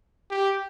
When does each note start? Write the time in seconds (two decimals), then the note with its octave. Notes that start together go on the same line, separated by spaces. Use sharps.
0.30 G4